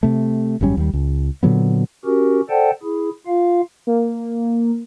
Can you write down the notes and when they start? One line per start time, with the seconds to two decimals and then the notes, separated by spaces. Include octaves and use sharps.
0.03 C3 A3
0.61 G#1 F#2 G3 C#4
0.77 D#2 G3
0.93 C#2
1.43 A#2 D3 F#3 B3
2.05 C#4 F#4 G4 A#4
2.49 A4 C5 D5 F#5 G5 A5
2.83 E4 G#4
3.27 F4 F5
3.87 A#3